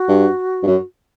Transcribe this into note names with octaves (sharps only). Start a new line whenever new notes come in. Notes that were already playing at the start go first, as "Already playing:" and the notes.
Already playing: F#4
G2
G2
F#2